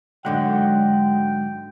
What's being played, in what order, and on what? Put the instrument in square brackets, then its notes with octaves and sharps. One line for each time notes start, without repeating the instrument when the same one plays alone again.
[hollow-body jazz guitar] G#2 D3 F#3 [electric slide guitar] G#3 D#5 F#5 [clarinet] G5